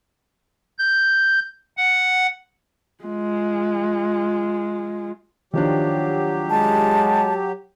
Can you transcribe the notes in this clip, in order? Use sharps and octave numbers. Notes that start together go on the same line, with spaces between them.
G6
F#5
G#3 F4
D#3 F3 F#3 D4 G4
G#3 A5